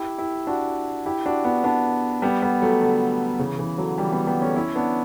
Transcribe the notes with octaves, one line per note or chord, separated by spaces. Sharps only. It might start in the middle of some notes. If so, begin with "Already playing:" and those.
Already playing: E4 G4
E4 G4
D4 F#4
E4 G4
D4 F#4
B3 D4
B3 D4
G3 B3
G3 B3
F#3 A3
D3
C#3 E3
C#3 E3
D3 F#3
E3 G3
G3 B3
G3 B3
A3 C#4
C#4 E4
B3 D4